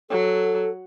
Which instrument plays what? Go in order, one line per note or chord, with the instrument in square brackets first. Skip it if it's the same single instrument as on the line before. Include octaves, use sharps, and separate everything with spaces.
[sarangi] F#3 [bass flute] A4